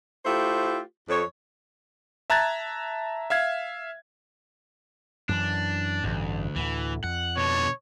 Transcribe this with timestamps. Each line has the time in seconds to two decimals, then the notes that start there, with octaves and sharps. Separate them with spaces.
0.24 A3 E4 F4 G4 C5
1.08 F2 C#5
2.30 E5 A5 A#5 F#6 G#6 A6
3.30 E5 F5 G#6
5.29 F#2 E3 D4
6.04 A1 D2 G2
6.56 D2 A2 E3
7.04 F2 F#5
7.37 B2 D3 C#5